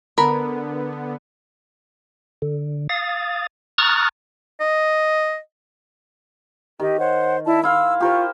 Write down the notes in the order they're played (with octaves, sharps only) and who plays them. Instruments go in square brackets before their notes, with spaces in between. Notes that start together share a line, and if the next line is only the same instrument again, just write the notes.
[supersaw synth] D3 B3 [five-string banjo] A#4 B5
[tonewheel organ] D3
F5 D#6 A6
A#5 C#6 D#6 F6 F#6 A6
[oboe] D#5
[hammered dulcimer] D#3 [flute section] G4 D#5
[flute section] C5 C#5 F#5
E4 D5 A5
[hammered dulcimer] E4 F5 C6 [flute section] E6
[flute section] F4 C#6 [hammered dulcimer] G4 A#4 C5